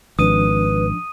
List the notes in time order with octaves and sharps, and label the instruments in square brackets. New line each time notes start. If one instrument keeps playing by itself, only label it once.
[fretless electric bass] G#1 [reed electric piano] F3 D4 [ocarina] B4 [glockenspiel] D#6 D#7